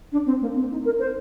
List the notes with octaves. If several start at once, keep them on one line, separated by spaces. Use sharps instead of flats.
D4
C4
A#3
C4
D#4
A#4
C5